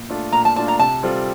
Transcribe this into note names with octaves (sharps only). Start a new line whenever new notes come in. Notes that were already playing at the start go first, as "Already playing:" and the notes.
Already playing: A#2
A3 D4 F4
A#2 A#5
A5
A3 D4 F4 A5
A#5
C3 A5
G3 C4 F4 A4